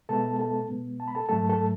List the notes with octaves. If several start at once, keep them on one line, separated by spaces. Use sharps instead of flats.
B2 G#3 B3 A4 A5
A4 A5
B2 G#3 B3
A5
B5
A4 A5
G#2 F#3 A3 A4 A5
A4 A5